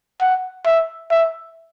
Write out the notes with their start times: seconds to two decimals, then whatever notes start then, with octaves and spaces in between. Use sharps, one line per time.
0.21 F#5
0.66 E5
1.11 E5